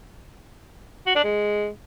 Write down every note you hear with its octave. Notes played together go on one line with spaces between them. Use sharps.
F#4
D4
G#3